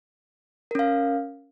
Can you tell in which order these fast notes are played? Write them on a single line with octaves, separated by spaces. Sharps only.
A#4 C#4 F5